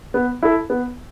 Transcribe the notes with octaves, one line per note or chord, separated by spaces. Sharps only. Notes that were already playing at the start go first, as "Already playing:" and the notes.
B3
E4 A4
B3